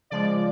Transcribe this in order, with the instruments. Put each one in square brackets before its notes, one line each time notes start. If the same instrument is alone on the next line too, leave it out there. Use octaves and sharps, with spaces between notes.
[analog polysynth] C#3 F3 G#3 D5